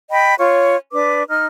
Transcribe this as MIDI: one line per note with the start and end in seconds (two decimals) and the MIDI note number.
0.10 0.34 75
0.10 0.34 79
0.10 0.34 83
0.38 0.75 65
0.38 0.75 73
0.38 0.75 85
0.92 1.22 62
0.92 1.22 71
0.92 1.22 86
1.28 1.46 63
1.28 1.46 89